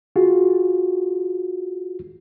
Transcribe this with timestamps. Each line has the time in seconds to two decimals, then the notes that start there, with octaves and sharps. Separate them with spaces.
0.16 F4 F#4 G#4